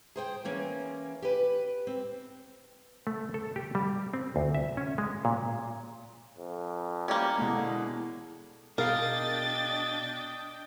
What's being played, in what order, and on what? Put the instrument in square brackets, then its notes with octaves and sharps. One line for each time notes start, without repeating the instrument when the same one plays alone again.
[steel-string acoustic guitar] G#4 C5 G5
E3 A#3 C#4
G4 B4
C4
[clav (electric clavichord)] A3
A4
G4
G3
C4
D2
E5
C#4
G#3
A#2
[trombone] F2
[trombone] G3 [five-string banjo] A#3 C#4
[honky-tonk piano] B2 E3 G#3 [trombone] D3
[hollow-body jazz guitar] B2 G#4 F5 [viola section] D4 D#5 G5 [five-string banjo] A#4 [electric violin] A6